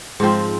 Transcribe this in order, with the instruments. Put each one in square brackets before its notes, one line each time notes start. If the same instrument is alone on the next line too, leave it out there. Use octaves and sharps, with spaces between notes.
[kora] G#2 F3 C4